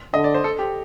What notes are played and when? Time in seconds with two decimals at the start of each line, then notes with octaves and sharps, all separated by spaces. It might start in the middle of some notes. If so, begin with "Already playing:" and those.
0.14 D3 D#5
0.24 D5
0.34 C5
0.44 A4
0.59 G4